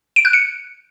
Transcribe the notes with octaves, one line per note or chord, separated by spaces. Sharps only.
D7
F#6
C#7